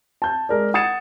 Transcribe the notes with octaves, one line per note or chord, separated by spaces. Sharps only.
A5 G6
G#3 A#4 D5
F#5 D#6 G#6 A6 C#7 E7